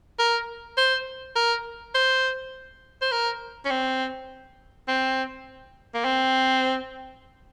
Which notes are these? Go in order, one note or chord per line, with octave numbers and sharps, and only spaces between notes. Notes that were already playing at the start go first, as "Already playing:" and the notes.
A#4
C5
A#4
C5
C5
A#4
C#4
C4
C4
A#3
C4